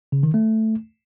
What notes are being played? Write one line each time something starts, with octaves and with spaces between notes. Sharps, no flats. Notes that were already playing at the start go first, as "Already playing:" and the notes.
C#3
D#3
A3